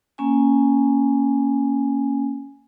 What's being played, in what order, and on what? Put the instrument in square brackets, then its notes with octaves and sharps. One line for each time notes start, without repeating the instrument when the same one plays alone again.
[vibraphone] A#3 C#4 G#5